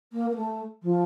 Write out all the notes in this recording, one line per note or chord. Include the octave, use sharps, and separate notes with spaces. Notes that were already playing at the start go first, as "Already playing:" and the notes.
A#3
A#3
A3
F3